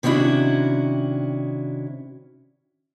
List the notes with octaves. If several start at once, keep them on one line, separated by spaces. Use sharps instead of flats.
C3 D#3 C#4 D4 E4 F#4